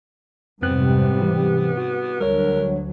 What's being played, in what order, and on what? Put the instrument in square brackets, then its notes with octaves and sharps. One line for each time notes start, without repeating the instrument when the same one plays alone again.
[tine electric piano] F2 C4 F#6 [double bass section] G#2 C3 G3 [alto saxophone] B3
[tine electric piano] E3 G4
F#4
[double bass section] D2 F#3 [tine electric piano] G3 C#5 [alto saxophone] A#4